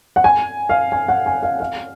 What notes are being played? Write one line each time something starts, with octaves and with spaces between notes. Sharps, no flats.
F#5
G#5
F5
G#5
F#5
G#5
F5
F5